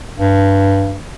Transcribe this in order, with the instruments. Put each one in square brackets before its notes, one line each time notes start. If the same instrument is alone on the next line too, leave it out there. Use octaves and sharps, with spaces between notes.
[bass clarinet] G2